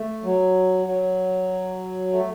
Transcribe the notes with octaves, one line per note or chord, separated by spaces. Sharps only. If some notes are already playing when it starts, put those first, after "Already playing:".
Already playing: A3
F#3
F#3
A3